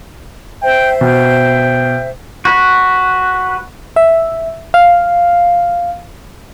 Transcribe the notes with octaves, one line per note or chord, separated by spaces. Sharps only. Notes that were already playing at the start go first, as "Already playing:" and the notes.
C5 E5 G5
B2 G5
F#4 B4
E5
F5